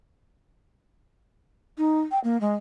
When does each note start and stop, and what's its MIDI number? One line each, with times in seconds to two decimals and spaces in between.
1.78 2.00 63
2.11 2.19 79
2.24 2.40 58
2.41 2.55 56